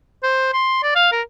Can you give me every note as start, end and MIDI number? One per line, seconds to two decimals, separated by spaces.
0.23 0.50 72
0.53 0.80 84
0.83 0.92 74
0.95 1.10 77
1.12 1.21 70